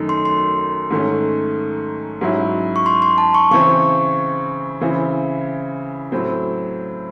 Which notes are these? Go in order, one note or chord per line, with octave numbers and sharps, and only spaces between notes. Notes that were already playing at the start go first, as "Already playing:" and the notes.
Already playing: F#2 D#3 A3 D#4
C6
C6
G#2 D#3 A3 C#4
G#2 F#3 C#4 E4
C#6
C6
C6
A5
C#6
C#3 E3 C4 C#6
C#3 E3 C4 E4
A2 F#3 C4